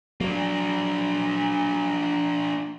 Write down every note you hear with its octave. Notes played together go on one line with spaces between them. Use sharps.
F#3 A#3 D4